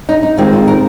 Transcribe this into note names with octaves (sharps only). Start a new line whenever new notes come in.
D#4
D#4
D#2 D#3 G#3 C4 F4
F4
A#4